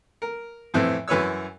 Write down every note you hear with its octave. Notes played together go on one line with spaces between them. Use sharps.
A#4
F2 A2 E3 C4
F#2 E3 B4 C#5 E6